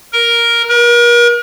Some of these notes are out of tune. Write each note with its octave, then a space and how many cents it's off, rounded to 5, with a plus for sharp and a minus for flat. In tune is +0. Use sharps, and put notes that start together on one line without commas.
A#4 +5
A#4 +40